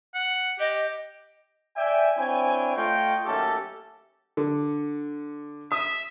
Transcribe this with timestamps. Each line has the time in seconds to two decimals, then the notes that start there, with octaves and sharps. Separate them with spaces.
0.15 F#5
0.60 G4 D#5
1.76 D5 E5 G5 G#5
2.17 C4 D4 E4 C#5 G5 G#5
2.76 A3 F4 C#5 D#5 F5 G5
3.25 D#2 F#3 A3 C#4 G4 A4
4.37 D3
5.72 E5 D#6